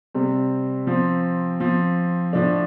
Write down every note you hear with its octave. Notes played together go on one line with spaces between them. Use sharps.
C3 G3 C4
F3 C4
F3 C4
A2 F3 D4